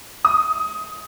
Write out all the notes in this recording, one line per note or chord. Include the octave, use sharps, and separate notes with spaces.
D#6